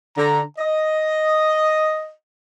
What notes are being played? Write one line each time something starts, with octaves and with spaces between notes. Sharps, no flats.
D3 A#5
D#5